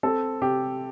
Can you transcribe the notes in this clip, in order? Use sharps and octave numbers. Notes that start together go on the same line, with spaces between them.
C4 A4
C3 G4